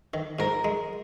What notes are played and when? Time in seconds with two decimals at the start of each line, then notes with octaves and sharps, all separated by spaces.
0.14 D#3
0.39 G#2 A#4
0.64 G#3